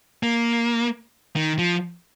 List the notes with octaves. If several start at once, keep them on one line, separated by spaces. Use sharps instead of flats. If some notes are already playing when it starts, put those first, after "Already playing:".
A#3
D#3
F3